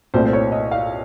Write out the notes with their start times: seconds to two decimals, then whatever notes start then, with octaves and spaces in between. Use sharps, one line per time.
0.14 C2 A#2 A3 C4 C5
0.26 C5
0.33 C#5
0.52 D#5
0.71 F5